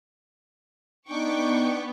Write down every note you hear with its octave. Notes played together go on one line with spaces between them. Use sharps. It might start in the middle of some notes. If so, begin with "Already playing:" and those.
B3 D4 D#4 G5 C#6 D6